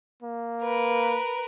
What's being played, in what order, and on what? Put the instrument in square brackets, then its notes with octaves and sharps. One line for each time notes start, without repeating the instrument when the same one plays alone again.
[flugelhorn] A#3
[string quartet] A#4 B4